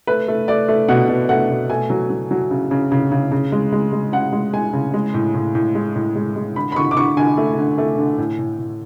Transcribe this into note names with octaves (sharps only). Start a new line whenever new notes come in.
A3 B4
A3
A3 D5
A3
B2 F#5
B2
A3 F#5
B2
A3 G#5
F#3
F#3
F#3
C#3
C#3
C#3
C#3
C#3
G#3
G#3
G#3
C#3 F#5
G#3
G#3 G#5
C#3
G#3
A2
A2
A2
G#3
A2
G#3
G#3
D3 B5
B5
D3 C#6
D6
D3 C#6
D3 G#5
A3
D3
A3
D3
A2
A2
A2